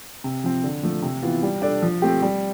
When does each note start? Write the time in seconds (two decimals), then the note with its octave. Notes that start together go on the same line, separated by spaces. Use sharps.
0.24 C3
0.44 F3 C4
0.63 D3
0.83 F3 A3
1.02 C3
1.22 E3 B3 F4
1.43 G3
1.62 D4 A4 D5
1.82 F3
2.02 A3 C4 G4
2.22 G3